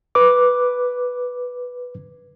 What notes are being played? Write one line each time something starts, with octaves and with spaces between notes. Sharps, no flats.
B4 D6